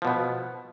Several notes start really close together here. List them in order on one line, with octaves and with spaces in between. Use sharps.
F3 B2 B3